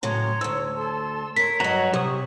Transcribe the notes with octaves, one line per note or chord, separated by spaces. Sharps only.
A2 C#3 F#3 C#5 A#5 C6
D2 G#2 E6
A4 A5 C6
A#4 C#5 B6
G2 F#3 F#4 D#5 A#5
C3 G4 C#6 D#6